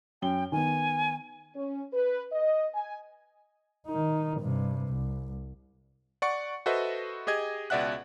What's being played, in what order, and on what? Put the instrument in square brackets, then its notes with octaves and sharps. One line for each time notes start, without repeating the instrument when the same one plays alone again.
[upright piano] F#2 G7 [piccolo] G5
[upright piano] D#3 B3 [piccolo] G#5
[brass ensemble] C#4
B4
D#5
G#5
[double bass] D#3 D#4
G2 C3
C2
[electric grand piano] D5 F#5 C#6 C#7
F#4 A4 B4 C5 D#5 E5
G4 G#4 D#5 G#6
C#2 B2 D5 E5 F#5 F#6